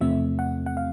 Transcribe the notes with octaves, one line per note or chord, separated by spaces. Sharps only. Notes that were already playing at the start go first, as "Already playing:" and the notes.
E2 C3 F3 A3 C4 E5
F#5
F#5
F5